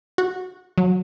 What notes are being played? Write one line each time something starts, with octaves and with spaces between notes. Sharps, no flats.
F#4
F#3